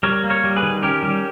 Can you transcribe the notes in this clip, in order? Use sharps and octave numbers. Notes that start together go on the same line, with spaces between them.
G3 A#4 C#5
A#3
A#4 C#5
G3
G#4 B4
D#3
C#4 G4 A#4
G3